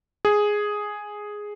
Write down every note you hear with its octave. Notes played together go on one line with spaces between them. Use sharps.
G#4